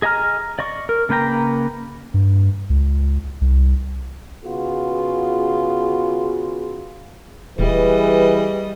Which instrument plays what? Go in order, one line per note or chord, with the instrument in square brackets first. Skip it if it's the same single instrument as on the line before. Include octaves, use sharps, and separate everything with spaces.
[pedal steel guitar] G#4 D#5 G#5 A#5 F6
D5 D#5 C#6
A#4
C#3 A#3 B4 G5 A#5
[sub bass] G2
C#2
C2
[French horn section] C#3 B3 F4 F#4 G#4
[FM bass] D#1 [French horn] E3 [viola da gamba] G3 D#5 [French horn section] G#4 B4